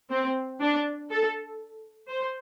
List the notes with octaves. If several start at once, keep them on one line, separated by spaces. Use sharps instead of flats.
C4
D4
A4
C5